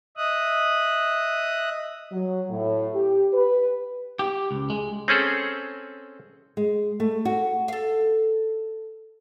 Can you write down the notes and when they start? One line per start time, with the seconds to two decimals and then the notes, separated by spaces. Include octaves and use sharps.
0.17 D#5 E5 D#6 F#6
2.11 F#3
2.50 A2
2.94 G4
3.33 B4
4.19 G4
4.51 C#2
4.70 G#3
5.08 C4 C#4 G#4 A4
6.57 G#3
7.00 A3
7.25 F#4
7.68 A4 F5